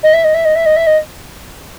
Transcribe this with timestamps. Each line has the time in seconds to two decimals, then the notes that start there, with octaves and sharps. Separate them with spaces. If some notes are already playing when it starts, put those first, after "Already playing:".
0.03 D#5
0.13 E5
0.24 D#5
0.34 E5
0.45 D#5
0.55 E5
0.66 D#5
0.76 E5
0.87 D#5